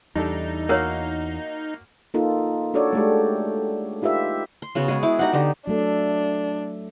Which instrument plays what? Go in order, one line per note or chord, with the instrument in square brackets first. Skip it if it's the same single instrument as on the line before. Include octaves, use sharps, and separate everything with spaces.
[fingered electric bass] E2 [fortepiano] G3 D4 A4 [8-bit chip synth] D#4
[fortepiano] A#3 F#4 F5 [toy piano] A#4 C#5
[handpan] A#3 D#4 F4 A4
D4 F#4 A4 C#5 D5
G#3 A3 G4
D#4 F4 G4 B4 E5
[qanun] C6
C#3 B3 F#4 C#5
G#3 B3 G#4
E4 D6
D#4 F#4 G4 F#5
D3 D#4 G4
[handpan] F#3 A3 A4 [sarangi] D4